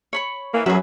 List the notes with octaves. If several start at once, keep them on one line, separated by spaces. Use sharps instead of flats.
C#5 B5 C#6
E3 A#3
F#2 F#3 C#4 G#4 B4 E5